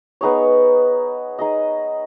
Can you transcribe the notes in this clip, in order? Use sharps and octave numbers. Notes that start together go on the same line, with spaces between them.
B3 D#4 G#4 C#5
D#4 G#4 D#5